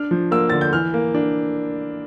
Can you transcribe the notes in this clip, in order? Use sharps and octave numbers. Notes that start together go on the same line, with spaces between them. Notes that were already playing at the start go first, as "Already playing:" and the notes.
Already playing: D4 F6
F3
A#3 E6
D3 A6
G6
E3 F6
A#3
D4